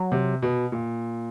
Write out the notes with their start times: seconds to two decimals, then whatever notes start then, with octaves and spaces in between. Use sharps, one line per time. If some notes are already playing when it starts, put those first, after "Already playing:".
Already playing: F#3
0.12 C3
0.42 B2
0.72 A#2